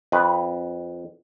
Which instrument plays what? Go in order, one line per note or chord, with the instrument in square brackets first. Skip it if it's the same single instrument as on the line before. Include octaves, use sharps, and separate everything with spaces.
[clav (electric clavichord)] F2 B4